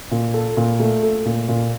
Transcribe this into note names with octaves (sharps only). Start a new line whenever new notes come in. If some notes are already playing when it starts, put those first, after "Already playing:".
A#2
A4
A#2
A3
A4
A#2
A#2